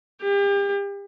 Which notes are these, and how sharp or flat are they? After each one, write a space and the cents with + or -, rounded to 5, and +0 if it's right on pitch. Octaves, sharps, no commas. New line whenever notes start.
G4 +35